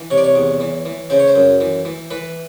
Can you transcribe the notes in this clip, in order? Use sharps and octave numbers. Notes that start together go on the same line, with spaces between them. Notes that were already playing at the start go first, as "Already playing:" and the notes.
Already playing: E3
C3 C#5
D5
C#5
E2
E3
E3
C#3 C5
C#5
C5
F#2
E3
E3
E3 B4